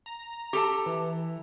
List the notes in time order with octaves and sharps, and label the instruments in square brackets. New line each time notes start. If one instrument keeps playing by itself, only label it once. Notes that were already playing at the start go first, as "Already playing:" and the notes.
[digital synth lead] A#5
[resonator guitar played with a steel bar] G4 A4 A5
[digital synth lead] E3